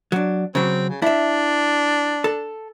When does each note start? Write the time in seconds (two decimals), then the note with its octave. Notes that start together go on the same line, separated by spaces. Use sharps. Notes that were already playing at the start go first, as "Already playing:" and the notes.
0.12 F#3 D4
0.55 C#3 F#3 C4
0.90 C#3
1.02 D4 E4 E5
2.24 A4